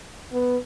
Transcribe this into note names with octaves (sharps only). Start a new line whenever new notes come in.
B3